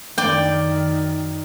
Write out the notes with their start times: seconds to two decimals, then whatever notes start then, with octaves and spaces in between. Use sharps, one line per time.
0.18 F#2 D#3 D5 G5